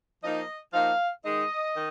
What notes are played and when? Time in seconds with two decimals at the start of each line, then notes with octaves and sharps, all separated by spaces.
0.23 F3 A#3 D#4 D#5
0.73 F3 A#3 D#4 F5
1.25 D#3 G#3 D#4 D#5
1.75 D#3